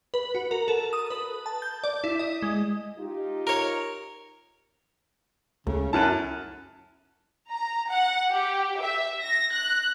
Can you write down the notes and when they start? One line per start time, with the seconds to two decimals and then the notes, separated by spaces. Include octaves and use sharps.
0.14 B4
0.35 F#4
0.51 A#4
0.68 A4
0.93 D#6
1.10 B4
1.46 A5
1.62 G6
1.84 D5
2.04 E4
2.19 D#5
2.42 G#3
2.98 D#4 F4 G4
3.47 A#4 C#5
5.67 C#2 C#3 A3
5.93 F#2 E4 A5 F6 F#6 D#7
7.51 A#5
7.90 F#5
8.32 G4
8.81 E5
9.21 A#6
9.54 F#6